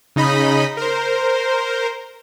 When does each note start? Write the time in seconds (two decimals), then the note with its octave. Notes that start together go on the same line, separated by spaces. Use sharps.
0.16 C#3 D#4 D#5 B5
0.77 A#4 C5